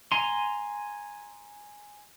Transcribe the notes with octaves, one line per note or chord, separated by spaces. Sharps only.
G#5 A#5 C6